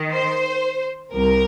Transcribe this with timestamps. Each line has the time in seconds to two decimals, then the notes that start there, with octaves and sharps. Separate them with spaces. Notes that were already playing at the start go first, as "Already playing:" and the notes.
Already playing: D#3
0.11 C5
1.14 C2 A#4